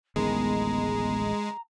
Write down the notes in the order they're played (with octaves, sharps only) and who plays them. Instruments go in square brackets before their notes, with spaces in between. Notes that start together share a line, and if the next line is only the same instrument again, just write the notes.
[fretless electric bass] D1 A1 D#3 [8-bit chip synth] G#3 [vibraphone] B3 [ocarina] A#5